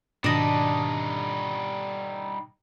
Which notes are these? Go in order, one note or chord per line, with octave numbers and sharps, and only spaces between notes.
G#2 B2 D#3 G3 D4 D#4 D#5